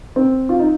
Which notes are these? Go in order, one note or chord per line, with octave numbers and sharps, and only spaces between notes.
C4
F4
D#4